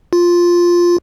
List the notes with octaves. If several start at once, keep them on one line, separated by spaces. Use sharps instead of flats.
F4